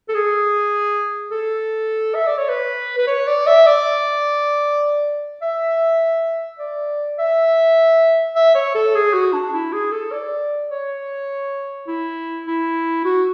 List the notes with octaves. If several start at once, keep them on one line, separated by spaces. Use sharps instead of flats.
A4
G#4
A4
E5
D5
C#5
B4
B4
C#5
D5
E5
D5
E5
D5
E5
E5
C#5
A4
G#4
F#4
D4
E4
G#4
A4
D5
C#5
E4
E4
F#4